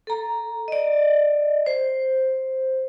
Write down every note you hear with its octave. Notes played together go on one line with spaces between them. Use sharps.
A4 A#5
D5 D#5
C5